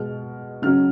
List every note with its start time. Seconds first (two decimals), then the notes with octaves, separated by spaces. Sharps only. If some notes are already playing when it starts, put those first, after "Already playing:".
Already playing: B2 G#3 B3 F6
0.62 C#3 F#3 C#4 F6